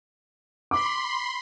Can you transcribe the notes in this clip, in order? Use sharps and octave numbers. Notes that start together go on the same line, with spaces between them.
B5 C6 D6